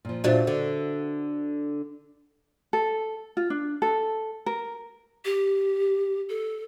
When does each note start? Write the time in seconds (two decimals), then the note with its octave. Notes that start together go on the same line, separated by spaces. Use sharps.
0.05 A#2 F3
0.24 A#2 D4 F4 F#4 C5 E5
0.47 D3
2.73 A4
3.37 F4
3.50 D4
3.82 A4
4.46 A#4
5.25 G4
6.29 A4